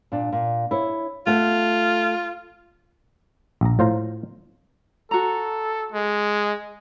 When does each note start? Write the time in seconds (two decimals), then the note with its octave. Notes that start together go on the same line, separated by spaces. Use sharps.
0.12 A#2 D4
0.33 A#2
0.71 E4 C#5
1.27 A3 F4 F#5
3.61 A#1 A#5
3.79 A2 F4 C5 F5 A#5
5.11 F#4 A4 A#5
5.92 G#3